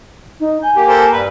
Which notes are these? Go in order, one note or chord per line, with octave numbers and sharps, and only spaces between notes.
D#4
G#5 G6
A#3 G4
A4 A#4 C5
G2 G3 B4